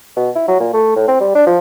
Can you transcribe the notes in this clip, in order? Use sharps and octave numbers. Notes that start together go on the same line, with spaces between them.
B2
E4
F#3
A#2
A3
A2
C4
G3
D4
F3